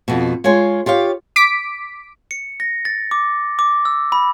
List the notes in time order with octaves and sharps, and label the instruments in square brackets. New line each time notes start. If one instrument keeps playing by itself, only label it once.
[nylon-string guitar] F2 B2
G#3 F4 C#5 G#5
F4 G4 C#5 F5
[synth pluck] D6 B6 D7
[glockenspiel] C#7
A#6
A6
D6
D6
E6
B5